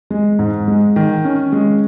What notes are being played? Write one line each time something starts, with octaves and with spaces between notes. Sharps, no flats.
G#3
G#2
G#3
D#3
C#4
G#3